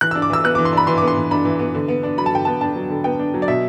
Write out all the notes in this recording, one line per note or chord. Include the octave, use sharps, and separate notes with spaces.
E3 F#6
E6
D4
D6
E3 E6
B3 F#6
D6
E3
C6
D4 B5
E3 C6
B3 D6
C6
E3
D4 B5
E3
B3
D3
B3
D4
F#3 B5
A5
D3 G5
B3 A5
D4 A5
F#3
D3
B3 G5
D4
F#3
D5
B2 E5